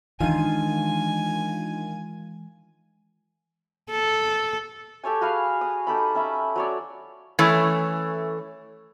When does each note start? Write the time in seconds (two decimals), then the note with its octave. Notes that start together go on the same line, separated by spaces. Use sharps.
0.20 D#3 E3 G#3 D4 D#4 F4 G#5 D#7
3.91 A4
5.04 G4 A4 C#5 G#5
5.21 F#4 G#4 B4 F5
5.61 D#6
5.87 D#4 G4 A4 B5
6.15 C#4 E5 B5
6.56 F#3 C#5 D5
7.39 E3 A3 C#4